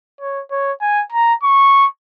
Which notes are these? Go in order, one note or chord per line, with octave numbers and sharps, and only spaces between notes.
C#5
C#5
G#5
A#5
C#6